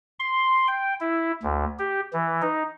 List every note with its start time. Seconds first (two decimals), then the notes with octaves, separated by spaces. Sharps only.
0.19 C6
0.68 G5
1.00 E4
1.43 D2
1.79 G4
2.13 E3
2.42 D#4